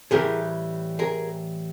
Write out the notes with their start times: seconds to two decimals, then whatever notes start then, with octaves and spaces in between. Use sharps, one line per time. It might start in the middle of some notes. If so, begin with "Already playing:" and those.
0.11 A2 E3 G3 G#4 A#4
0.99 G#4 A#4